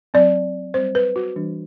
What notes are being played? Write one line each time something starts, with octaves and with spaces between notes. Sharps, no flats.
F#3 C4 D5
G3 C4 C5
B4
F#4
E3 G3 D4